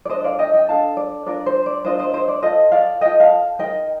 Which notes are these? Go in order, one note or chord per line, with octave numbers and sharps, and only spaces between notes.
D5
D4 A4 C5 D#5
D5 F5
D#5 G5
D#5 G5
D4 A4 F5 A5
D5
D4 F4 A#4 D5
C5
D5
D4 F4 A#4 C5 D#5
C5 D#5
C5 D#5
D5
F4 A4 C5 D#5
D5 F5
F4 A4 D#5 G5
F5 A5
D#4 A#4 D#5 G5